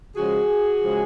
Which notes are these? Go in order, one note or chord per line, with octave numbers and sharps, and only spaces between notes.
C#3 F3 G#3 F#4 G#4
C#3 F3 G#3